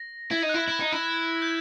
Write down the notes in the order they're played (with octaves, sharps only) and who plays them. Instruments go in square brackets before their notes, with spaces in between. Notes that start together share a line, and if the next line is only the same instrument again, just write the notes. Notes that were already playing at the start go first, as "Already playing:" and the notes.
Already playing: [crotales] A#6
[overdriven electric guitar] E4 [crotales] G#6
[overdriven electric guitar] D#4
[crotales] F#6
[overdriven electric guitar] E4
E4
D#4
E4
[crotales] G6